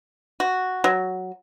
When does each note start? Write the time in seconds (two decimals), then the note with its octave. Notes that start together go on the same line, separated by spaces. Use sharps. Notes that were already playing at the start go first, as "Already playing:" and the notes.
0.40 F#4
0.84 F#3